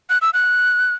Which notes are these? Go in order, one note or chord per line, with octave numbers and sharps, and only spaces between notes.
F#6
E6
F#6